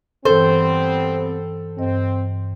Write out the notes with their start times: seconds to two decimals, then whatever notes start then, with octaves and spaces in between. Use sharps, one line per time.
0.25 G2 E3 G3 B3 C4 A4 C5
1.78 G2 C4 D#5